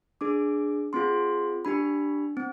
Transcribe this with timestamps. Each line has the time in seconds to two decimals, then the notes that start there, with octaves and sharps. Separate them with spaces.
0.21 D4 G#4 D6
0.93 C4 F4 G#4 C6
1.65 D4 G4 B5
2.37 C4